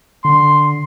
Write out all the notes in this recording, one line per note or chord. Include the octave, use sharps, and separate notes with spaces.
D3 C6